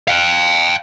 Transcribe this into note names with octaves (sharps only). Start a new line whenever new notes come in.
F5 G5